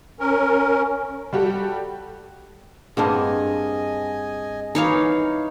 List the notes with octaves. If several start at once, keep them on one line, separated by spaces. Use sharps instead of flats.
C#4 A#4
G3 F#4 G4 A4
G2 A#3 C4 G#4 D#5 F#5 G#5 A5
E3 A#3 D#4 C#5 F5